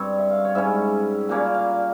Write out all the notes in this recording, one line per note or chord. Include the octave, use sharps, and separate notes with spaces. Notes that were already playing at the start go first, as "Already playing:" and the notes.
Already playing: G2 G3 C4 C#5
E5
F5
C#5
G#2 G3 C#4 E5
A#2 G3 A#3 C#4 F5
F5